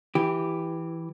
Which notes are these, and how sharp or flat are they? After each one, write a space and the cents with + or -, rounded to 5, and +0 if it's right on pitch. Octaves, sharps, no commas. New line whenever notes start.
E3 +0 G4 +0